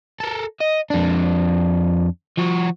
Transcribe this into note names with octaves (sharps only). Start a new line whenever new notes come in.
A4 A#4
D#5
F2 D4
F3 F#4